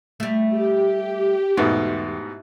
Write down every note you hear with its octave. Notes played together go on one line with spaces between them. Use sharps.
G3 A3
G4
E2 G#2 B2 A3